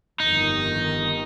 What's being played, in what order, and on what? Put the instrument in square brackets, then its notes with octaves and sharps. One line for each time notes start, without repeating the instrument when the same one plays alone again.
[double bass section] G1 F2 D#3 [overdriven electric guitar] D#4